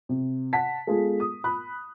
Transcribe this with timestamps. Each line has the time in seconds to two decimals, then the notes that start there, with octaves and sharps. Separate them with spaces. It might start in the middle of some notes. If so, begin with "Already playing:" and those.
0.09 C3
0.53 F#5 A5 B6
0.87 G#3 B3 F4 G#4 A4
1.20 D#6
1.44 B5 F#6